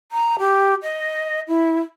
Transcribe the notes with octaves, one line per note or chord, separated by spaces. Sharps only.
A#5
G4
D#5
E4